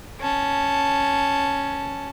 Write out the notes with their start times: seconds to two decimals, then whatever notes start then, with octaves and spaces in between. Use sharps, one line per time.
0.20 C#4 A5